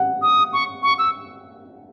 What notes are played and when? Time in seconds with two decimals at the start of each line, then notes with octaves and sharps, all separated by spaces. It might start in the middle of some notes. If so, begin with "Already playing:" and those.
Already playing: F#5
0.22 D#6
0.53 C#6
0.83 C#6
0.99 E6